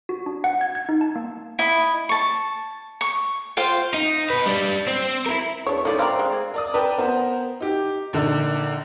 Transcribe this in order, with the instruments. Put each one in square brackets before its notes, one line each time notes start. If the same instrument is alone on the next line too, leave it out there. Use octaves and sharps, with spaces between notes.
[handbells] F#4
D4
F#5
G#6
G#6
D#4
A5
A#3
[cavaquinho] E4 D#5 B5
A5 C#6
C#6
F4 C5 F5 G5
[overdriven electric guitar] D#4
B2 B4
G3 D4
C4
E4 A#4
[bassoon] E2 [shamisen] D4 C#5
[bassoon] A2 [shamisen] D#3 A3 [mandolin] C#4 F4 D5
[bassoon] C4 [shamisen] D4 E4 A#4 [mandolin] D5 F5
[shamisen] G#3
[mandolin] G#5
[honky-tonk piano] A#4 D5 D#6
A#4 B4 D5 G5 A5
B3 A#4 C5
D#4 G4
A#1 D3 D#4 A#4 D5